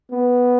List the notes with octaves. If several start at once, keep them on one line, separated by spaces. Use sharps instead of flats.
B3